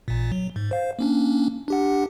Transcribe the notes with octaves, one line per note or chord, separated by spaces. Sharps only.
A1 A#2
F#3
G#2
C5 F5
A#3 C#4 D4
D4 G4 F#5